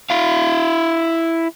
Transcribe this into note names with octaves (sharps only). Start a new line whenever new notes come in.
E4 F5